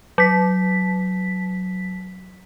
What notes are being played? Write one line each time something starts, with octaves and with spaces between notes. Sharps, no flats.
F#3 B6